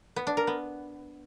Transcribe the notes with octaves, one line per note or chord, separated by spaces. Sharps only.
B3
D4
A#4
B3